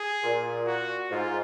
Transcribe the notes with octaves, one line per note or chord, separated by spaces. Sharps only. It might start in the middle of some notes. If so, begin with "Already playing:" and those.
Already playing: G#4
A#2
F#4
G#2 F4